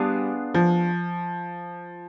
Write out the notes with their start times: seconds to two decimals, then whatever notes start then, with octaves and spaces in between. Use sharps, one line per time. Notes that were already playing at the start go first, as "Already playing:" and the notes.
Already playing: G3 B3 D4 F4 G#4
0.54 F3